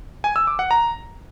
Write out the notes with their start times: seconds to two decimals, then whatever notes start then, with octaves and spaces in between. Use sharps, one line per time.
0.24 G#5
0.36 E6
0.47 D6
0.59 F#5
0.71 A#5